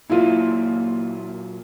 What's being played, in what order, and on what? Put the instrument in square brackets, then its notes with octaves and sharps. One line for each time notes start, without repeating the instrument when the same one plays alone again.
[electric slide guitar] A#2 F#3 A#3 [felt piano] E4 F4